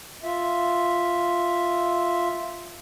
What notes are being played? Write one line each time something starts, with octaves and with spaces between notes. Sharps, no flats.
F4 E5